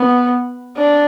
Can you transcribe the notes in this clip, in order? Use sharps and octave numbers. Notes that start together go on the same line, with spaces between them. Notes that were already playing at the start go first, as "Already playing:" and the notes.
Already playing: B3
D4